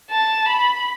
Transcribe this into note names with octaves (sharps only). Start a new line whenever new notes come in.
A5
B5